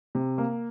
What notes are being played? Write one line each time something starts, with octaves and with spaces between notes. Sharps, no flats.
C3
A#3